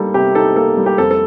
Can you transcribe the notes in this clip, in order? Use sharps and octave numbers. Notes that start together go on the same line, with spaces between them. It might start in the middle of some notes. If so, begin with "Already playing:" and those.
Already playing: G3 A#3 D#4 A4
C3 G4
D#4 A4
A#3 A4
G3
G4
F2 A4
A4